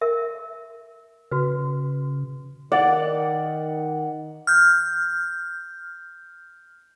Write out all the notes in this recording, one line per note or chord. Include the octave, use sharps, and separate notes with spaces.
A#4 E5
C#3 F#4 B4
D#3 D5 F#5
F6 G6